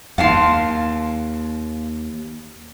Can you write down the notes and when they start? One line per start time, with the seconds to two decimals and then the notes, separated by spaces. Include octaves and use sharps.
0.18 D#2 F5 A5 C6